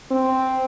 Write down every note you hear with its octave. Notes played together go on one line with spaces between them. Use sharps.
C4